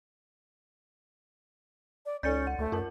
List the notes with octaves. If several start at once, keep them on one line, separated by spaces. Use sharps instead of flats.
D5
C#2 C#4 D#4 A4 D5 G6 A6 C#7
F#5
D2 A3
F#2 F4 A#4 A5